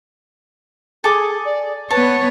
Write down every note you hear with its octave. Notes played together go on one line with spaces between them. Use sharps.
G#4 A4 G#5 D6
D5
B3 B4 C#5 A5